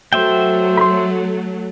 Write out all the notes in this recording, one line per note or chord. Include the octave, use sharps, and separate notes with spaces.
F#3 A3 F#4 C5 E5 G5
B5 C6